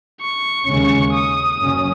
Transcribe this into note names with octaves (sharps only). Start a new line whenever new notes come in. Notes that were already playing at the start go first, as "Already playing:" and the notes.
C#6
D#2 C#3 G#3 C#4
D#6
F#1 F#2 C#3 F#3 C#4